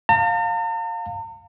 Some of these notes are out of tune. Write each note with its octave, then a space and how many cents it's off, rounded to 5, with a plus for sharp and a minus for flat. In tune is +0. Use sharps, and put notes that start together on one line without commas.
F5 +20 A#5 -45